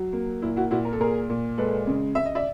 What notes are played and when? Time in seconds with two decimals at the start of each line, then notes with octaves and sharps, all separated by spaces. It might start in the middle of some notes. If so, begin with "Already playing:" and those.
Already playing: F#3
0.13 A#3
0.42 A#2 E4
0.56 E4 F#4
0.71 A#2 E4 F#4
0.85 A#4
0.93 A4
0.99 A#2 G#4 A#4
1.29 A#2
1.58 G#3 A4 B4
1.87 C#3
2.15 C#3 E5
2.25 D#5
2.35 D5 E5